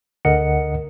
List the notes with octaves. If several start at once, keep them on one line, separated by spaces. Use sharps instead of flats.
D2 D3 A#4 D#5 F#5 C#7